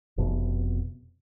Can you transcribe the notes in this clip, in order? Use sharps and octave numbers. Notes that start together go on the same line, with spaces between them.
F1 B2